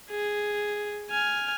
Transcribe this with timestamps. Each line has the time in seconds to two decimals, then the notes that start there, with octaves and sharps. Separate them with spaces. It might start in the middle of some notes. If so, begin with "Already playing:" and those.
0.11 G#4
1.11 G#5 F6